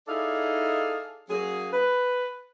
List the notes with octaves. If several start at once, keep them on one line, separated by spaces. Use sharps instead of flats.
D#4 E4 G#4 A4 D5 F5
F#3 A#3 C#4 G#4
B4